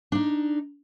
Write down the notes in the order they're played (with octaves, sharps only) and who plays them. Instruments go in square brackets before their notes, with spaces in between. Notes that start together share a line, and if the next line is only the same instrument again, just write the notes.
[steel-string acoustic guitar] D4 D#4